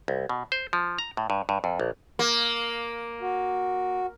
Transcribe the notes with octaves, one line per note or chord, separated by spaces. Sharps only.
C2
B2
C5
F3
A#5
A2
G2
G2
F2
A#1
A#3
F#4